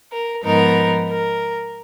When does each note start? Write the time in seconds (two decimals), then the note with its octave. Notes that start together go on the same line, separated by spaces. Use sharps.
0.13 A#4
0.44 G#2 F3 B3 D#4 A#4
1.09 A#4